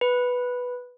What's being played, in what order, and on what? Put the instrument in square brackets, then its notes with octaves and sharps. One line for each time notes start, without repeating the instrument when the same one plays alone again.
[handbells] B4